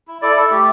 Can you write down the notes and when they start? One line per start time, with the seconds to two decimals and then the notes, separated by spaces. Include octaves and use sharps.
0.08 E4
0.22 E4 A4 D5
0.36 E4 A4
0.51 A3 G4